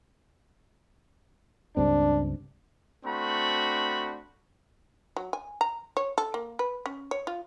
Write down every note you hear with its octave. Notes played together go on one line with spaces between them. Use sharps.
C#2 G2 C4 D4
A3 C4 D4 F#4 B5 C#6
F#3
G#5
A#5
C#5
A4
A#3
B4
C#4
C#5
F4